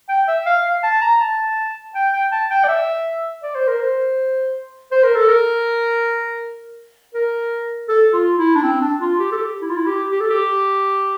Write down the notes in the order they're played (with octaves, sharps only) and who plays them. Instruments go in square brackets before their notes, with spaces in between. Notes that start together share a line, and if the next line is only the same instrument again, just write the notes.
[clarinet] G5
E5
F5
F5
A5
A#5
A5
G5
G5
A5
G5
D5
E5
D5
C5
A#4
C5
C5
A#4
A4
A#4
A#4
A4
F4
E4
D4
C4
D4
F4
G4
A4
G4
E4
F4
E4
G4
G4
A4
G4